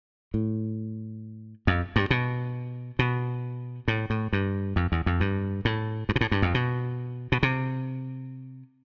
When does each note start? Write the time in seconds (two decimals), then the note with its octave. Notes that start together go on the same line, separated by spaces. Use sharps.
0.34 A2
1.67 F2
1.96 G2
2.10 B2
2.99 B2
3.88 A2
4.10 A2
4.33 G2
4.76 F2
4.92 E2
5.06 F2
5.20 G2
5.65 A2
6.09 G2
6.16 B2
6.21 A2
6.31 G2
6.42 F2
6.54 B2
7.32 B2
7.43 C3